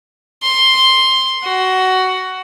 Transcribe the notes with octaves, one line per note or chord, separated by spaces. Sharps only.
C6
F#4